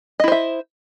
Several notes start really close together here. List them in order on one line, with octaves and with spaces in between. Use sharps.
D#5 E4 C5 E5